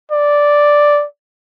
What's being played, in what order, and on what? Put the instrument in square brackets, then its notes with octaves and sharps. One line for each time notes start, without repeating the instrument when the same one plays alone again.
[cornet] D5